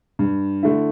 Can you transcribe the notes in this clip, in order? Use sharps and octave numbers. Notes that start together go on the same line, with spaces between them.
G2
D3 A3 E4